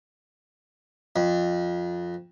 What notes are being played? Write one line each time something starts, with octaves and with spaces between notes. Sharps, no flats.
F2